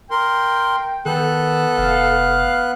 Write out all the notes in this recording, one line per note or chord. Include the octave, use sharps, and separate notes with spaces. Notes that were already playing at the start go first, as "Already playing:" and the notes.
A#4 G5 C6
D#3 B3 A4 F#6
F1 F5